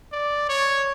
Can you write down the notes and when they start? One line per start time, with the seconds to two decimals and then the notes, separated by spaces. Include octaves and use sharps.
0.12 D5
0.49 C#5